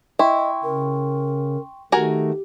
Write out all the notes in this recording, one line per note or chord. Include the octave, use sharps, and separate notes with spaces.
E4 D#5 G5 C6 C#6
C#3 A#4
D#3 A3 F#4 G4 A#4 G#5